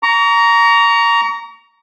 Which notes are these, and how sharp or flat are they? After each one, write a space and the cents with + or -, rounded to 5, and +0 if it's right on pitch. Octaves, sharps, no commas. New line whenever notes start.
A#5 +0 C#6 +40